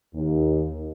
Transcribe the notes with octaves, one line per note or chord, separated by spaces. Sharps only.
D#2